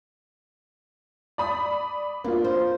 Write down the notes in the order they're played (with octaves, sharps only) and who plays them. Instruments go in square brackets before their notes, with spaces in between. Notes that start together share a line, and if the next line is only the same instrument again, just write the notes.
[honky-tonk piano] D5 B5 D#6
[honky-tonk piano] A#3 F4 [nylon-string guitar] D4
[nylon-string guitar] C5